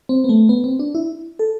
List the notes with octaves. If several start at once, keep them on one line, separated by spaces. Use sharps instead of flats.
C4
B3
A3
B3
C4
D4
E4
A4